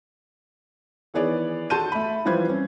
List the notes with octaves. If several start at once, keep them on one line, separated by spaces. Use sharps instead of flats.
D#3 E3 B3 G#4 C#5 D5
F#4 A4 A5 C6 G6 D#7
A3 B5
E3 F3 G3 B4 C5 G#6
C4 C#4